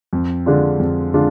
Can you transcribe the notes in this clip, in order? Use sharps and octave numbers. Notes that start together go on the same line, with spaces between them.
F2
D3 G#3 D4 F4
F2
D3 G#3 D4 F4